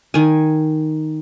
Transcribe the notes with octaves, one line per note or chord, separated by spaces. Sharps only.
D#3 G#5